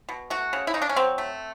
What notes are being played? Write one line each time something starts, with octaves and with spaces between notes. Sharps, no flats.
B2
A3 F#4
C#3
E4
C#3 D#4
D4
C#4
F#3 C4
A3